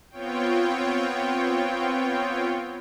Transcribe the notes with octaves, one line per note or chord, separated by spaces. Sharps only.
B3 C4 F4 C#5 G5